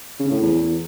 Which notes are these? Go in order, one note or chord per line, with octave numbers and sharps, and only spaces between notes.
C#3
A2
E2